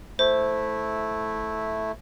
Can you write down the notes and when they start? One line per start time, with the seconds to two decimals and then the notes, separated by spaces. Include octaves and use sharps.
0.19 A3 E4 C5